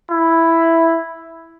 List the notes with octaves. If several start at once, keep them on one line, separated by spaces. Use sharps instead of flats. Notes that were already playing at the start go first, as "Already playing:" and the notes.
E4